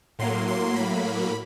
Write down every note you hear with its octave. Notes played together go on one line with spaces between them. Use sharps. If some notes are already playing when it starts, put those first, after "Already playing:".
A2 F#3 A#3 C6
C6
B5